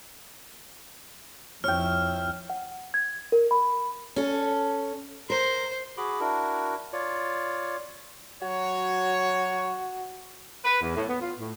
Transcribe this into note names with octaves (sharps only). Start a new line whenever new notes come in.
F2 E4 C#5 G5 F6
F#5
G#6
A#4
B5
C#4 A4
A#4 C5
F#4 G#4 B5 D6
D4 E4 F#4 A#4
F4 C#5 D5
F#3 F#4 C#5
B4
E2
A2
B3
F4
A2